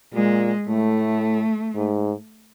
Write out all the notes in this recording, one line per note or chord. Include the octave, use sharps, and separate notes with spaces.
A#2 G#3
A2 A3
G#2